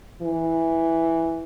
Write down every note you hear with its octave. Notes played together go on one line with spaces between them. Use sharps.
E3